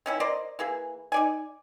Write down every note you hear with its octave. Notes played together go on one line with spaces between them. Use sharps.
D#3 C#4 E4
A#4 C5 D5 D#5
E3 A#3 G#4
D#4 D5 G#5